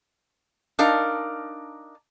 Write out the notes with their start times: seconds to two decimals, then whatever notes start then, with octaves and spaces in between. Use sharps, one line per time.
0.79 D4 D#4 A#4 F5